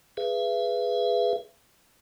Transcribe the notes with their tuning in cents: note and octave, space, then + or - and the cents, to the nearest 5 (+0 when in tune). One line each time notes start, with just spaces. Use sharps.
G#4 +0 B4 +0 E5 +40